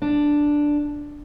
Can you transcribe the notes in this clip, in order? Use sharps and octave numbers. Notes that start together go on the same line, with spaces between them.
D4